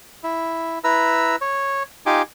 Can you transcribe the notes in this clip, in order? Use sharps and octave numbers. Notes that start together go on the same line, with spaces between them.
E4
E4 B4 A#5 E6
C#5
D#4 F4 G4 G#5 D6